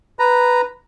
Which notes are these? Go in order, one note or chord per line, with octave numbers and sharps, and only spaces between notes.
B4 A#5